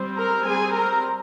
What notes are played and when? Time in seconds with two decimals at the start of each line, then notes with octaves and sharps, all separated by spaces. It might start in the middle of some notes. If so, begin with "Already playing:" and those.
Already playing: G3 C4
0.17 A#4 A#5
0.45 G3 C4 G#4 G#5
0.73 A#4 A#5